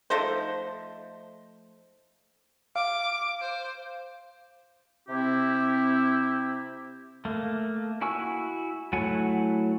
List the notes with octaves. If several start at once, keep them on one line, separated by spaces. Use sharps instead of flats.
F3 A3 D#4 C5
F5 D6
C5
C3 C4 E4 G4
A3 A#3
E4 F#4 G#5 C#6 E6
F#3 A3 E4 F#5 G#5